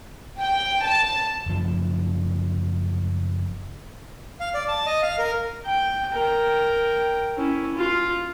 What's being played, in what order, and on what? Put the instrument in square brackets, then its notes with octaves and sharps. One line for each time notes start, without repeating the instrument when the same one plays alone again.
[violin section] G5
A5
[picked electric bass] F#1 F3
[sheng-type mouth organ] F5
D5
A5
D#5
F5
A#4
[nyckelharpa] G5
A#4 G5
C#4 E4
F4